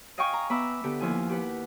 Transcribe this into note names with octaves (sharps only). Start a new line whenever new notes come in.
D#5 F5 G5 G#5 C#6
A#5
B3 E5 A#5 B5 D6 E6
D3 B3 G4
D#2 F3 E4 G#5
G4 B4 F#5